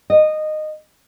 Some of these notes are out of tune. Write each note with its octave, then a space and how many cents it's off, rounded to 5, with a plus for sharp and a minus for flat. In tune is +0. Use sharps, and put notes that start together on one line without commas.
D#5 -15